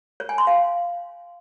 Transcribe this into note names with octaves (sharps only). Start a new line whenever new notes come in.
C#5
G#5
C6
F5